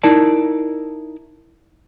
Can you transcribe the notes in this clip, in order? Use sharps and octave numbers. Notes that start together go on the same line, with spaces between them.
D#4 E4 A#4 D5 A5